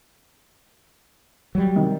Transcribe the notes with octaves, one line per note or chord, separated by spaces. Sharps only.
F#3 G3
C3 D#3